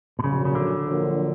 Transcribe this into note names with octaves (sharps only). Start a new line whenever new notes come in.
B2
A#1 A#2 C#3 F#3
C#3
D3
A#1 A#2 F#3